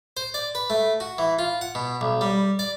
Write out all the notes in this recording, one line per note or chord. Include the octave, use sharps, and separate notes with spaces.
C5
D5
B4
A3
F#4
E3
F4
F#5
B2
B1
G3
D5